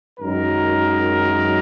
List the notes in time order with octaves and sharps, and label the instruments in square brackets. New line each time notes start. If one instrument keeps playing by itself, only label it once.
[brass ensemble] G#1 F#2 D#3 F#3 A#4